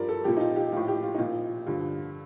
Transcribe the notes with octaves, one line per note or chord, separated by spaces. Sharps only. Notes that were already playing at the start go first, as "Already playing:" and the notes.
Already playing: G2 F3 A#4 D5
A4
A#2 F3 G4
D#4
F4
G4
A2 F3 F4
G4
F4
D#4
A#2 F3 F4
G2 D3 F3